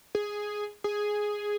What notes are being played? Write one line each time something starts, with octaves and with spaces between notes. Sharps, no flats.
G#4
G#4